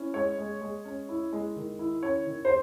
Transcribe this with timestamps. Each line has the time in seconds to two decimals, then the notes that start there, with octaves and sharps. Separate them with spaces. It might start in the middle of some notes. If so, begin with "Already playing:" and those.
Already playing: C#4 E4
0.14 G#3 C#5
0.38 G#3
0.61 G#3
0.85 C#4
1.09 E4
1.33 G#3
1.56 D#3
1.79 E4
2.03 C#4 C#5
2.27 D#3
2.45 C5